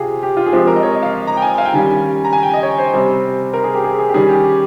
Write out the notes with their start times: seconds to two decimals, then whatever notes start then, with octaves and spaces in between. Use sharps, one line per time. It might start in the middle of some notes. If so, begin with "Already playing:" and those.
Already playing: C3 F4 G4 G#4
0.23 G4
0.37 F4
0.46 G#4
0.53 F3 G#3 C4 G4
0.67 A#4
0.76 D#5
0.83 C#5
0.92 D#5
1.03 F5
1.27 A#5
1.37 G5
1.42 G#5
1.58 F5
1.65 G5
1.73 D#3 G3 C#4 G#5
2.25 A#5
2.33 G#5
2.43 G5
2.53 D#5
2.63 C#5
2.78 C5
2.93 C3 G3 C4
3.54 A#4
3.64 G#4
3.74 G4
3.84 G#4
3.99 G#4
4.09 G4
4.14 D#3 G3 C#4 G#4
4.29 G4
4.43 G4